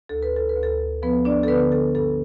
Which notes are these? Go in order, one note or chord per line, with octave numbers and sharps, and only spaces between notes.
D2 A4
B4
A4
B4
D2
A4
F3 B3 B4
D4 D5
A4
D3 B3 B4
A4
G2 A4